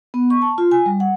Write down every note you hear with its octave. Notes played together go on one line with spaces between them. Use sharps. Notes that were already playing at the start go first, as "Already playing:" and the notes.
B3
C#6
A5
F4
G#5
G3
F#5